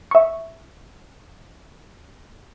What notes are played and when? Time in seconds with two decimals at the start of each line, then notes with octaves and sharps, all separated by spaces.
0.11 E5 C#6